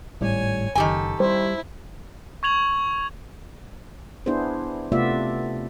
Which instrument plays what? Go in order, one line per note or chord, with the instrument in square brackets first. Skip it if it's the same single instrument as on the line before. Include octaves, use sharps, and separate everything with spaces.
[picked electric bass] G#1 A2 G3 [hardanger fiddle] C#5 G#5
[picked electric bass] F#1 [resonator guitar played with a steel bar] D#3 G4 G#5 [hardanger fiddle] A4
[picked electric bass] G3 [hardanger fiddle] E4 [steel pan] C5
[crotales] C#6 G#6 F7 F#7
[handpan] B3 D4 E4 G#4 C5
C3 A3 B3 F4 D5 E5